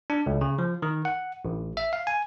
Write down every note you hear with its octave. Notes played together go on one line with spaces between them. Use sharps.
D4
C#2
C#3
F3
D#3
F#5
A1
E5
F5
G#5